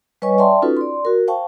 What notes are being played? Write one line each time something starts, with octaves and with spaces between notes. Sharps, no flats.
G3 B4 C#5 D#5 G#5 C#6
D5 E5 G5 A5 C6
C#4 D#4 F4 F#4 A4 B4
D5 C6
F#4 A#4
C5 F5 G5 A5 C#6